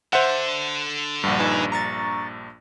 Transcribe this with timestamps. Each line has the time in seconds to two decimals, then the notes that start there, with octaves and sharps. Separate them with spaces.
0.13 D3 C5 E5 F#5
1.24 A#1 G2 G3 F#4
1.40 D#4 B4 G#5
1.72 A#5 C#6 A6